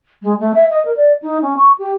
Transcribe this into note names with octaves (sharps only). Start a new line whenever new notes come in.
G#3
A3
E5
D#5
A#4
D5
D#4
C#4
C#6
G4